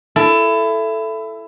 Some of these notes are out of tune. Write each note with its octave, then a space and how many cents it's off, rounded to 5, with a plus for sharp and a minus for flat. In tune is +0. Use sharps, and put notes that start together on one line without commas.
E4 +20 A4 +0